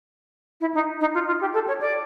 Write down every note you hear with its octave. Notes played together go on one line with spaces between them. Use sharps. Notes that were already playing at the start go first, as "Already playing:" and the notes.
E4
D#4
D#4
F4
F4
G4
A4
C#5
D5